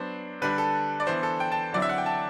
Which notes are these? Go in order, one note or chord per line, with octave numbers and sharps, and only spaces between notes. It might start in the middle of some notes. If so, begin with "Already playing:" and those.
Already playing: F#3 B3 D4 C5
D3 G3 D4 B4
A4
D5
E3 B3 D4 C5
A4
G5
A5
D3 F#3 C4 E4 D5
E5
F#5
G5
A5